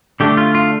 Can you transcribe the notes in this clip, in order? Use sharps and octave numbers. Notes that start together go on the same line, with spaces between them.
D3 A3 D4 G4
F4
F4